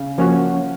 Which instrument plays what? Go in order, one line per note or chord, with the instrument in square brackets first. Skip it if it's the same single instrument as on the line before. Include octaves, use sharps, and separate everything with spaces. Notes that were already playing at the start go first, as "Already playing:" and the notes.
Already playing: [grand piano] C#3
[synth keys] F3 A#3 C#4 F#4